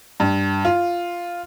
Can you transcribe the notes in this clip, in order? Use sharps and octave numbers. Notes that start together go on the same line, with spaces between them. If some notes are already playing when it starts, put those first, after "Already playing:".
G2
F4